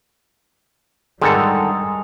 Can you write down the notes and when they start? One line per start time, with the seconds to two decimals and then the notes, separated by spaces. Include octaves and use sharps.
1.22 G#2 D3 D#3 G3 G#3 A4 A#4 A#5